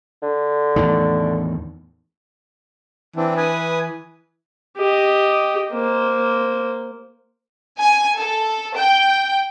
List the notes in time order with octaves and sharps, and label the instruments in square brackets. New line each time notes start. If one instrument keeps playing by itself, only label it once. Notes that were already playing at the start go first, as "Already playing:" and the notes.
[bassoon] D3
[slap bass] E2 A2 D#3
[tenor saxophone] E3 [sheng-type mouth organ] C4 D4
[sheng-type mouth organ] B4 G#5 D#6
[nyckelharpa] G4 D#5
A#3 C5
[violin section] G#5
A4
G5